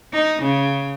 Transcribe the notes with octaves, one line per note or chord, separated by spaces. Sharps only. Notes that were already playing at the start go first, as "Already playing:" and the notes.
D#4
C#3